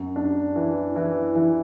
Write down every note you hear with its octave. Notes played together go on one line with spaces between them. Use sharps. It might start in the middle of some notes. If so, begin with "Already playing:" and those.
Already playing: F#2
D4
E3
E3
E3